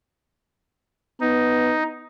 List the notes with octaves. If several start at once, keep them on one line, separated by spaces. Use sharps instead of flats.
B3 D#4